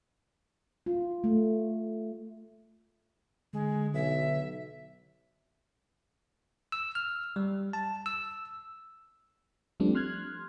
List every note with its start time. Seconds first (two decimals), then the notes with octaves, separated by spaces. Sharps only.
0.86 F4
1.24 A3
3.53 D3 G#3
3.94 B1 E5
6.72 E6
6.95 F6
7.36 G3
7.73 A5
8.06 E6
9.80 F3 G3 A3 C4 D4
9.95 C6 F6 F#6 G#6